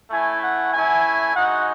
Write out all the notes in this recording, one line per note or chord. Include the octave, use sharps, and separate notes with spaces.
A3 C#4 E4 G#5
F#5
A3 C#4 E4 G#5
G#3 D#4 F#4 F#5